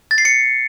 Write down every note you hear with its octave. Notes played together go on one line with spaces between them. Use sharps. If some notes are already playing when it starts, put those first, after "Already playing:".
A6
C7
C#7